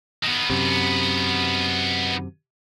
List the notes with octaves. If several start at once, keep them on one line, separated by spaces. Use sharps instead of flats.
D#3 B3
F#2 C3